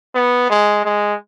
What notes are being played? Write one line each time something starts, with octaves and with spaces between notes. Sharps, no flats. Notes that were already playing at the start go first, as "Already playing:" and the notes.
B3
G#3
G#3